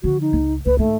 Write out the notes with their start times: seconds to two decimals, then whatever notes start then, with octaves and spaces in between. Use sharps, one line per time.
0.03 D3 F3 F#4
0.21 D#4
0.33 C#2
0.66 C#2 B4
0.79 G#2 D#3 A3